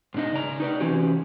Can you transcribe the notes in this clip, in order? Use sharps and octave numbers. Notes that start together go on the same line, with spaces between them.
G#2 B2 D4 D#4 D#5
C#3 D5 A#5
D#4 B4 D5
C3 E3 C#4 F#4 G4